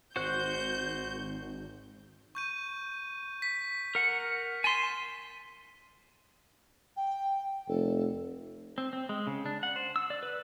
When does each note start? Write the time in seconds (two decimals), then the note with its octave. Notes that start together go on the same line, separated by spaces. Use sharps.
0.16 G#1 F#4 C5 F#6 G6
2.35 C#6 G6 D#7
3.42 B6
3.95 A#4 F#5
4.64 G#5 C6 A6 B6 E7
6.96 G5
7.68 F1 A4
8.78 C4
8.93 C4
9.09 G#3
9.27 C#3
9.46 D4
9.63 F#5
9.76 C5
9.96 E6
10.10 D5
10.23 B4